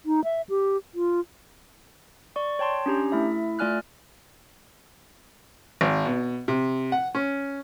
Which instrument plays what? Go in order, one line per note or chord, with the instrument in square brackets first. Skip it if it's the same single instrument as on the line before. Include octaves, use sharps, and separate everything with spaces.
[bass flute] D#4
E5
G4
F4
[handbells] D5 C#6
C#5 G5 A5 C6
C#4 D4 G4 A#5
A3 E4 E5
A3 F4 D5 G#5 F6 F#6
[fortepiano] G#1
B2
C3
F#5
C#4